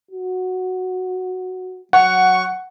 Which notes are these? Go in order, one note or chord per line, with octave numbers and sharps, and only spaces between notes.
F#4
F#3 F#5 C#6